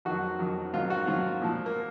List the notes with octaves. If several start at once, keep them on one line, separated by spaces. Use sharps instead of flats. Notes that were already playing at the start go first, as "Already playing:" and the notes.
F2 D#3 F#3 F#4
F2 D#3 F#3
G#2 D#3 F#3 F4
F#4
G#2 D#3 F#3 F4
A#2 F3
A#3